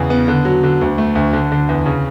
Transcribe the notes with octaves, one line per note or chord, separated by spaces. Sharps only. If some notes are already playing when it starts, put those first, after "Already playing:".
Already playing: E2 C#3
B3
D3
F#3
D3
D2
A3
D2
D3
D3
E2
C#3